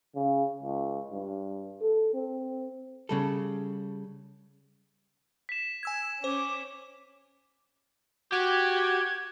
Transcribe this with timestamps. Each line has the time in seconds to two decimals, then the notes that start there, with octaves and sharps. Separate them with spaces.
0.15 C#3
0.63 C#2
1.11 G2
1.81 A4
2.14 C4
3.09 C#3 G3 A4
5.49 B6 E7
5.83 G#5 E6 G#6
6.24 C#4 C5 D6
8.32 F#4 G4 G#6